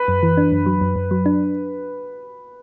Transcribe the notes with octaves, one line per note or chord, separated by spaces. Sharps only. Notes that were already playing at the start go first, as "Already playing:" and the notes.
Already playing: B4
F#2
E3
D4
F#2
F#3
F#2
F#2
F#3
D4